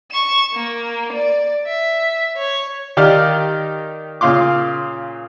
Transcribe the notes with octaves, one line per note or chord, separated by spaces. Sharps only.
C#6 E7
A#3
D5
E5
C#5
D#3 D#4 G4 D5 F5 F6
A#2 C#3 F5 C6 D6